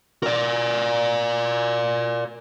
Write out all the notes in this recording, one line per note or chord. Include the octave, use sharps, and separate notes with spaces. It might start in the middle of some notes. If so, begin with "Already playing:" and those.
A#4 D5